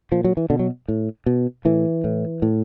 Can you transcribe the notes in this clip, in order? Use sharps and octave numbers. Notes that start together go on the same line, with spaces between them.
A#2 F3
F#3
E3
B2 D3
F#3
A2
B2
A2 E3
A2
A2